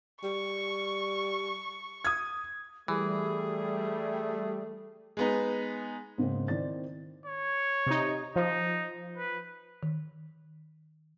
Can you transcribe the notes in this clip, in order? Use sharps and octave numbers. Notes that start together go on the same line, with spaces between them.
G3 C#6
D#6 G#6
E3 G3 A3 G#4
G#3 B3 D#4
G#2 C#3 A#3 C4
D#3 C4 E4 D5 A6
C#5
C3 D#4
F3 D#4
B4
D#3